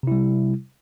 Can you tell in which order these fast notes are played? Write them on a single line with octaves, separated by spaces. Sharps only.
C3 E4 G3